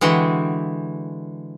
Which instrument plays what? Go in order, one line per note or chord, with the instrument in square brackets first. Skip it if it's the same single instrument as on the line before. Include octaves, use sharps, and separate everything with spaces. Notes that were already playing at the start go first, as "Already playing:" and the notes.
[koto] D3 E3 G#3 F#4 G5